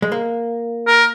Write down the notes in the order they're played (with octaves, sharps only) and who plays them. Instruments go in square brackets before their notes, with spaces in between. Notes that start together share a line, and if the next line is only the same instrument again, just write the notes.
[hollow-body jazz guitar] G#3
A#3
[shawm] A#4